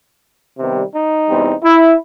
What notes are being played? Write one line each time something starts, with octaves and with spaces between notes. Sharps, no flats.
C3 D#3 G3 B3
D#4
E2 B2 G3 C4
E4